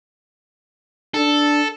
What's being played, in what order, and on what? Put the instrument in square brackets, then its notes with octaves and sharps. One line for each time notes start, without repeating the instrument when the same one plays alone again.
[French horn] D4 [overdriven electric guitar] A4